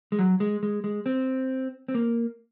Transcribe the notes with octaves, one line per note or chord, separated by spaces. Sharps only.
G#3
F#3
G#3
G#3
G#3
C4
C4
A#3